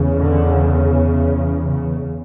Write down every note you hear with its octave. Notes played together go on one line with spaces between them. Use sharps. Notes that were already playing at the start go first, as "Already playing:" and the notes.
Already playing: E2 C#3
D3
C#3